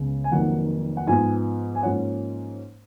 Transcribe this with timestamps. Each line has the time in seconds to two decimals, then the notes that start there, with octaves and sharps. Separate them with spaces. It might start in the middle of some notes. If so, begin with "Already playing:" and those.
Already playing: C#2 C#3 G#3 B3
0.24 G#5
0.32 F1 F2 D#3 F#3 A#3 F#5
0.97 F#5
1.07 G#2 F3 B3 G#5
1.75 G#5
1.83 G#2 F3 A#3 C#4 F#5